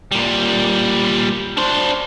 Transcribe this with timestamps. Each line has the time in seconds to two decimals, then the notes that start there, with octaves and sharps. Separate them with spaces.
0.12 A#2 G3
1.57 D4 C5